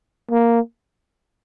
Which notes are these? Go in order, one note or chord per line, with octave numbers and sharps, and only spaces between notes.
A#3